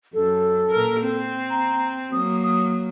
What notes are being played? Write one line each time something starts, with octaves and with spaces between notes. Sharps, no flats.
F#2 A4
A#2 A#4
C4
A#5
F#3 A#3 D#6
D#6